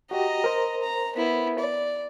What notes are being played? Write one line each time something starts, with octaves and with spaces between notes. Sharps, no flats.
F#4 G4 D#5 A#5
A#4 C5
A#5
B3 E4
D5